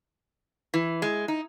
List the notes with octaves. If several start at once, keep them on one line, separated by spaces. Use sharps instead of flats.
E3
G#3
D#4